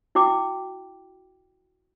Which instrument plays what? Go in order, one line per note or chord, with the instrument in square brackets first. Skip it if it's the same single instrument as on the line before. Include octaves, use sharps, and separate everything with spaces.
[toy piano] E4 F#4 G5 D6